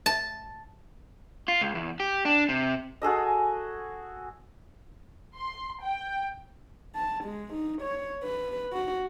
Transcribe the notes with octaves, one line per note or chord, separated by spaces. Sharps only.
A5
F4
C#2
E2
G4
D4
C3
F#4 G#4 A4 D#5
C6
G5
A5
G#3
D#4
C#5
B4
F#4